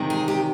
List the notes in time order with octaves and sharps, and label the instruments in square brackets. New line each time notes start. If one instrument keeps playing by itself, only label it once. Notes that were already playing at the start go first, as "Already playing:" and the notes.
Already playing: [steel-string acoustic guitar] E2 C3 D#3 G3
G#4
G4